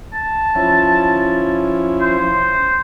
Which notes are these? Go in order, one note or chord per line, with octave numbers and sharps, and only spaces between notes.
A5
F3 C#4 E4
C5